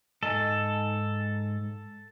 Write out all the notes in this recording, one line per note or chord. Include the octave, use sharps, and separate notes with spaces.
G#2 A4 D#5 G#5